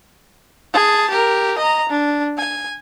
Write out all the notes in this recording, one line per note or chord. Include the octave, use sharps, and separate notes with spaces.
G#4 A5
G4 A#4
D#5 A#5
D4
G#5